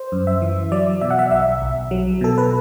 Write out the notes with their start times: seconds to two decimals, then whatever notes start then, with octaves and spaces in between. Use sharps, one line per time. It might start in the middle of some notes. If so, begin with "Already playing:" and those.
Already playing: C5
0.12 F#2
0.27 E5
0.42 E3
0.72 F#3 D5
1.01 B2 E5
1.11 F#5
1.19 E5
1.31 B1 E5
1.62 B1
1.91 F#3
2.21 B2 A4
2.38 B4